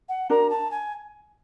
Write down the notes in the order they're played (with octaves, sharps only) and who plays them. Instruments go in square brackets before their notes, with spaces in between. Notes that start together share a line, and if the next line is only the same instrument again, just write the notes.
[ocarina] F#5
[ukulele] D4 F#4 A#4 [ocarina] A#5
[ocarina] A5
G#5